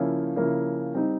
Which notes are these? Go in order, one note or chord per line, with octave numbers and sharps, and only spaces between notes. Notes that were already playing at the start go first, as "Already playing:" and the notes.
Already playing: C#3 F3 A#3 C#4 E4
C#3 F3 A#3 C#4 E4
G3 C4 D#4